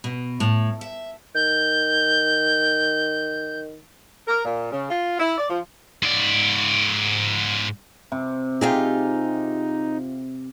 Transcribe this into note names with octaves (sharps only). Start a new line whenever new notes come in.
B2
A2
E5
D#3 G6
A#4
A#2
C#3
F4
E4
D5
F3
G#2 D5
C3
D#4 F4 G4 G#4